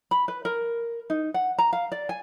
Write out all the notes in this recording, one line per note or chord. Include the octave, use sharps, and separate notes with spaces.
B5
B4
A#4
D#4
F#5
A#5
F5
D5
G#5